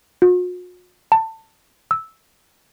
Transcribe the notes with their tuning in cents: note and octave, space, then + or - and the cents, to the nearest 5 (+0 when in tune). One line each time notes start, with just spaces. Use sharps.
F#4 -45
A5 +20
E6 -10